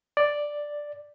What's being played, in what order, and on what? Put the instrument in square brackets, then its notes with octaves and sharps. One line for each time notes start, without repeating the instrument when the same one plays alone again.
[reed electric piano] D5